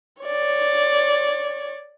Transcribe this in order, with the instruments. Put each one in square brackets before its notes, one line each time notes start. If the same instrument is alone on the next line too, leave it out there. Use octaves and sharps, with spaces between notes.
[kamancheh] C#5 D5